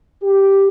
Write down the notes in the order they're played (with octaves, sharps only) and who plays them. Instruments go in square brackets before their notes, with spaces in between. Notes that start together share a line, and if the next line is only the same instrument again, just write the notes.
[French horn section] G4